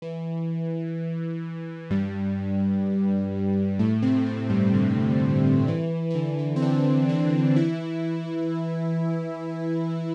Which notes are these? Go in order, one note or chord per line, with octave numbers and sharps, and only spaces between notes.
E3
G2 G3
A2 A3
C3 C4
A2 A3
G2 G3
D3
E3
E3
D3
E3
C4
D3 D4
D3 D4
E3 E4